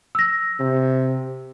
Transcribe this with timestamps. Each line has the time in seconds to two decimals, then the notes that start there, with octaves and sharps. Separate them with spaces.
0.15 E6 A#6
0.60 C3